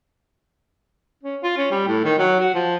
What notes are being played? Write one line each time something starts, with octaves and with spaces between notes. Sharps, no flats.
C#4
F4
C#4
G3
A2
D#3
F#3
F#4
F3